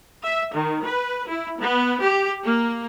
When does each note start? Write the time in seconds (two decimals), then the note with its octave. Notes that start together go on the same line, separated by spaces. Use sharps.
0.22 E5
0.54 D#3
0.83 B4
1.27 E4
1.58 B3
2.02 G4
2.43 A#3